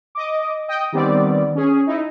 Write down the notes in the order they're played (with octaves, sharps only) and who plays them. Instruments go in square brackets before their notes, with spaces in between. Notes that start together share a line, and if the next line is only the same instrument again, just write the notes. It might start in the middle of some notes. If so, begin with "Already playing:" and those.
[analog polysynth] D#5 D6
D#5 G5
D#3 G3 B3 C4 D5
C#4 G#4
D#4 E4